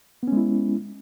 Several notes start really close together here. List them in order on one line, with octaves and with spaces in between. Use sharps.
B3 C#4 G#3 E4